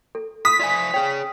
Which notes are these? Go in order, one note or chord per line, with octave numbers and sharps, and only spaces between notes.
A4
B5 D#6 B6
F4 D5 E5 G#5
G#4 C#5 G5